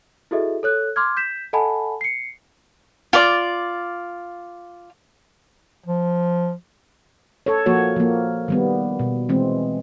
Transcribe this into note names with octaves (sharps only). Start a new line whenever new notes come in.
E4 F#4 G#4 A4 D#5 E5
A4 C#5 F#6
C6 D6 F6 G#6
G6 B6 E7
A4 D#5 F#5 G#5 A5 B5
C7 C#7
F4 D5
F3
A4 C#5
F3 A#3 F#4 C#5
F3 A#3
D#3 G3 B3
B2
E3 G#3 C4